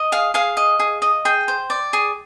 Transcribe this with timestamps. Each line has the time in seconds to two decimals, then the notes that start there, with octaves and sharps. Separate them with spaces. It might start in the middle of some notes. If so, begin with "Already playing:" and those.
Already playing: D#5
0.12 G#4 F5
0.34 G#4 F5
0.57 D#5
0.80 G#4
1.02 D#5
1.25 G#4 G5
1.48 C5
1.70 D5
1.93 G#4